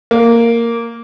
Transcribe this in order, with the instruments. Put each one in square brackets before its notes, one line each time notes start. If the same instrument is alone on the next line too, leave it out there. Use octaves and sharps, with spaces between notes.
[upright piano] A#3